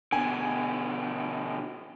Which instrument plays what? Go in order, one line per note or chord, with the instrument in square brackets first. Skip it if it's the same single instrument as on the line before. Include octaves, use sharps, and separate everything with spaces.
[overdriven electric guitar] B2 D3 [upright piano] G#5